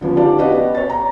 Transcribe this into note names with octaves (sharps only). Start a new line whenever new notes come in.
D3 F3 B3 C#4
D4 D#4 G4 D5 F5 A5
F#4 G4 B4 D5 D#5 F#5
B3
C#5 A6
A#5